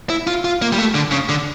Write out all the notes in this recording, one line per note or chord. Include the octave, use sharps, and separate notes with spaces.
E4
F4
F4
A#3
G3
A3
D3
C#3
D3